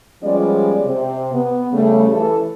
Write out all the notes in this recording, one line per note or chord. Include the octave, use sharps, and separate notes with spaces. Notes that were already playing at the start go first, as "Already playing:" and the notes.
F3 G3 G#3 B3 C#4 D5
C3
B3
C#3 G3 A3
E3 A4